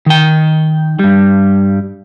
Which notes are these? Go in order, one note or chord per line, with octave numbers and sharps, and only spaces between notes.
D#3 G5
G2 G3